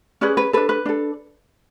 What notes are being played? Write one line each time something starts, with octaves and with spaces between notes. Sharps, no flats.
C#4 G#4 B4 D5
B4
D4 A4 B4
B4
D4 A4